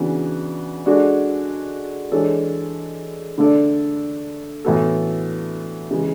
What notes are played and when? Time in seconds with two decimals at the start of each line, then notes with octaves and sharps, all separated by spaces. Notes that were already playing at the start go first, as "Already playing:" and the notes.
Already playing: C#3 E3 B3 D4 F#4
0.86 G#3 D4 F#4 A4 D5
2.12 E3 G#3 D4 A4 C#5
3.38 D3 A3 D4 A4 D5
4.65 A2 E3 B3 F#4 A4
5.91 C#3 E3 G#3